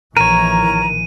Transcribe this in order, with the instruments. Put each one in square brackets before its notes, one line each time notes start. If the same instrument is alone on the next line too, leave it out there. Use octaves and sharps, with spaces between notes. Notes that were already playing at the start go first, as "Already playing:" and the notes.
[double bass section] A#1 D#3 E3 [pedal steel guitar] A#4 C#5 [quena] A#5 [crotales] D#7